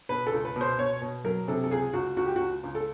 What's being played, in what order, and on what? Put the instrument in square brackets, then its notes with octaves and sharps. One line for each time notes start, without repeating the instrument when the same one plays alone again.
[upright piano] B2 B4
A4
C#2
B4
B2 C5
B2 C#5
B2
F#3 A#4
C3 A4
A4
C#2 G#4
C#2 F#4
C#2 F#4
G4
C#2 F#4
C#2
A4